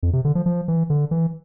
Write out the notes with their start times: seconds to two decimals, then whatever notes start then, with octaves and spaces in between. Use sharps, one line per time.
0.03 F2
0.13 C3
0.25 D3
0.35 F3
0.46 F3
0.68 E3
0.90 D3
1.11 E3